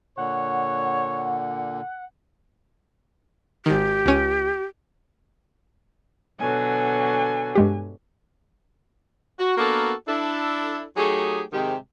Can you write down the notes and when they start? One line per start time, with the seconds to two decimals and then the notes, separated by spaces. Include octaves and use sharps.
0.18 A#2 D3 C#5 F#5
3.66 G#1 D#3 G4
4.06 C#2 C#4 D#7
6.39 B2 D3 F#3 G#5
7.55 G2 G#3 G4
9.40 F#4
9.58 A#3 B3 D4 F#4 A4 A#4
10.08 D4 E4 A4
10.97 F#3 A3 D#4 G4 G#4
11.53 G#2 C3 D#3 G#3 G4